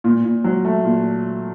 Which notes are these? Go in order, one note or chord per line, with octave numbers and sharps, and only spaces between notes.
A#2
A#2
F#3
A3
A#2